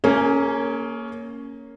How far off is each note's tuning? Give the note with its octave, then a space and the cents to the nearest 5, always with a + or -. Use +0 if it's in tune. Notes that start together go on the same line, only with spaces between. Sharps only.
A#3 -5 C#4 +0 G#4 +35